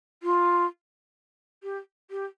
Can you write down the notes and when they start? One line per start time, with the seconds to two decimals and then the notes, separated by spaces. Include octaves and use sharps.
0.23 F4
1.63 G4
2.10 G4